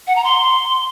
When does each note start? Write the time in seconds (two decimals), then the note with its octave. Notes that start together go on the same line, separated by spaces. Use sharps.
0.07 F#5
0.16 A#5
0.24 C6